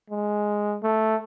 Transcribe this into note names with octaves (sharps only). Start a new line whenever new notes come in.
G#3
A3